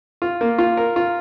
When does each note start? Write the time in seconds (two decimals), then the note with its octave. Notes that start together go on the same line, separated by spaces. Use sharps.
0.22 F4
0.41 A#3
0.58 F4
0.77 A#4
0.96 F4